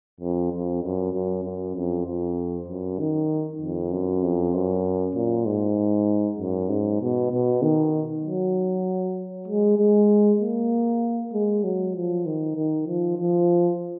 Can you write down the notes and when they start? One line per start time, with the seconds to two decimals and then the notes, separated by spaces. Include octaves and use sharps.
0.20 F2
0.53 F2
0.83 F#2
1.14 F#2
1.44 F#2
1.76 F2
2.06 F2
2.68 F#2
2.99 D#3
3.61 F2
3.92 F#2
4.23 F2
4.54 F#2
5.15 A#2
5.46 G#2
6.38 F#2
6.69 G#2
7.01 B2
7.31 B2
7.62 D#3
8.24 F#3
9.48 G#3
9.78 G#3
10.40 A#3
11.33 G#3
11.64 F#3
11.95 F3
12.26 D#3
12.56 D#3
12.87 F3
13.18 F3